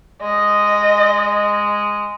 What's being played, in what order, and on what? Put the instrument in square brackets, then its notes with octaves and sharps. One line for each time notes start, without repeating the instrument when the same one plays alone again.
[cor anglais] G#3 [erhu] D#5